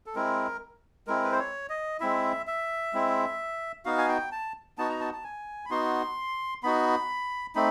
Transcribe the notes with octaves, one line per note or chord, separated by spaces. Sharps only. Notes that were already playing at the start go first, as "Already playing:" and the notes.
A4
G#3 C4 E4 A#4
G#3 C4 E4 A#4
B4
C5
C#5
D#5
G#3 C4 E4 E5
E5
G#3 C4 E4
B3 D#4 F#4 F5
G#5
G5
A5
B3 D#4 F#4 A5
A#5
A5
A5
G#5
B5
B3 D#4 F#4 C6
B3 D#4 F#4 B5
A3 C4 D#4 B5